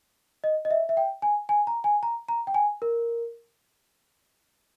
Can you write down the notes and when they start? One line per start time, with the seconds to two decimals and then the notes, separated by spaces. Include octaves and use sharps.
0.44 D#5
0.65 D#5
0.71 E5
0.89 E5
0.97 G5
1.22 G#5
1.49 G#5
1.67 A#5
1.84 G#5
2.03 A#5
2.29 A#5
2.47 G5
2.54 G#5
2.82 A#4